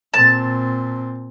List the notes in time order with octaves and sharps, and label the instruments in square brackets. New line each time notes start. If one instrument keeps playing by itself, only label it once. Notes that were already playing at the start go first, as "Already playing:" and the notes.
[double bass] A#2 C4 [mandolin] A5